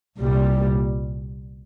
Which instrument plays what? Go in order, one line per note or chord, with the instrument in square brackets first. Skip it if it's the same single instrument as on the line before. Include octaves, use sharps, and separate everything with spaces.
[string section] C2 A#2 G3